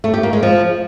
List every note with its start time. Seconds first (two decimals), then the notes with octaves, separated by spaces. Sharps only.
0.04 A3
0.14 G4
0.23 A#3
0.33 G#3
0.43 F3